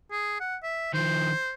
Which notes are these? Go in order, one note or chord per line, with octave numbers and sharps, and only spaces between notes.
G#4
F#5
E5
D#3 F3 C5